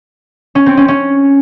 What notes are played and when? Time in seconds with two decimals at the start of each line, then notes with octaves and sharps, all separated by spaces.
0.55 C#4
0.66 C4
0.77 C#4
0.88 C#4